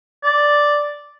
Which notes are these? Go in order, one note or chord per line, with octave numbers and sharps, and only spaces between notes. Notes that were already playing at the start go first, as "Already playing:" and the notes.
D5